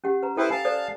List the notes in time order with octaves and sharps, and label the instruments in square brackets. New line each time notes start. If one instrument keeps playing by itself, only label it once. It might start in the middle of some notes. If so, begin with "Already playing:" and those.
[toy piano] C#4 G4 F#5
B4 A#5
[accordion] E4 B4 C5 [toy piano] A4 G5 E6
[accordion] F5 A5 [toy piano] G#5
[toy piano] A4 C5 D5